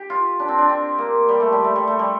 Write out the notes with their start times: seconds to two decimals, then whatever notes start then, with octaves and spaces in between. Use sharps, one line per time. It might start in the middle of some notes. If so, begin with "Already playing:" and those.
Already playing: G4
0.10 F4
0.40 D4
0.48 C4
0.58 D4
0.69 C4
0.98 A#3
1.29 G3
1.40 A3
1.53 G3
1.64 A3
1.76 G3
1.88 A3
1.99 G3